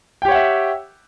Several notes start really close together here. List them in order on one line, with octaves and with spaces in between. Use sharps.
G5 G4 C#5 F#5 E5